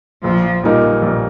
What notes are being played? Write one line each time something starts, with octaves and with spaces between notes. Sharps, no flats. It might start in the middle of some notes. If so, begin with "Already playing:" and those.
A#1 F3
A#2 G3 D#4 A#4
A#1